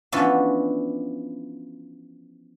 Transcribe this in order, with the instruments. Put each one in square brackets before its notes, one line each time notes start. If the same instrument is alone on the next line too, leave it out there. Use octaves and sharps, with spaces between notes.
[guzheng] E3 F3 B3 C#4 D4